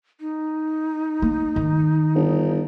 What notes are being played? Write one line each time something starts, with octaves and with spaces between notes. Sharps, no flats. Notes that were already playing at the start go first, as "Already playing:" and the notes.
D#4
A#3
D#3
G1